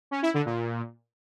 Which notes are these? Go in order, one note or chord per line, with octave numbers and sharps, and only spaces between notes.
C#4
E4
D3
A#2